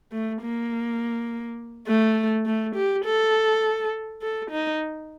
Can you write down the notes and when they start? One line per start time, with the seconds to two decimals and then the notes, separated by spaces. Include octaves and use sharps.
0.12 A3
0.42 A#3
1.87 A3
2.46 A3
2.76 G4
3.06 A4
4.22 A4
4.51 D#4